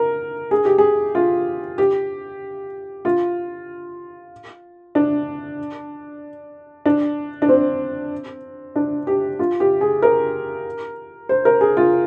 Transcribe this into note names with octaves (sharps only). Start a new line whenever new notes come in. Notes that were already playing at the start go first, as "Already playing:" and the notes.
Already playing: A#4
G#4
G4
G#4
F4
G4
F4
D4
D4
D4
C4
D4
G4
F4
G4
G#4
A#4
C5
A#4
G#4
F4